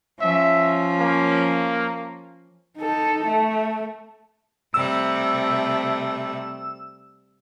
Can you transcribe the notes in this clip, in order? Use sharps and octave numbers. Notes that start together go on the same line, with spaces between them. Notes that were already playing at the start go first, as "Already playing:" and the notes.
F3 C#4 E5
A#3
D#4 A4
A3
C3 G3 A3 E6